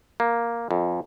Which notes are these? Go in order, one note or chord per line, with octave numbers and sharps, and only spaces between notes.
A#3
F2